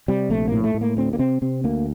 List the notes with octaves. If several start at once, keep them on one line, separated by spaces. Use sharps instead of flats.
C3 G3
A#1 A3
A2 A#3
A3
A2
A#3
D2 C4
A#3
C3 C4
C3 C4
D2 A#3